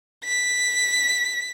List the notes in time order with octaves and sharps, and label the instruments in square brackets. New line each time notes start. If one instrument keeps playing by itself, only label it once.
[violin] B6